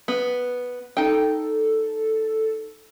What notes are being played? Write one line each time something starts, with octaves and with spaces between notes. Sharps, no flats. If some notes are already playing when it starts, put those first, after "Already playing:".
B3
D#4 A4 G5